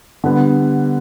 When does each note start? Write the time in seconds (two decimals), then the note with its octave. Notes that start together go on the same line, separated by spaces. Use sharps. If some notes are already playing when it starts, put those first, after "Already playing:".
0.24 D3 G3 B3